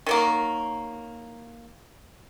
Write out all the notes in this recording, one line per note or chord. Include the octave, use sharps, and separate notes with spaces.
D#3 F#3 A#3